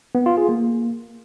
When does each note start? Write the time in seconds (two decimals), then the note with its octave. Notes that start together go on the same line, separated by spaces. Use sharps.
0.15 B3
0.26 F4
0.37 G#4
0.49 A#3